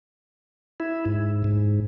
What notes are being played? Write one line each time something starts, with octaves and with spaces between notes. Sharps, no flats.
E4
G#2
G#2